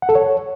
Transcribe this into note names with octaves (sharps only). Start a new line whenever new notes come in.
F#5
A4
C#5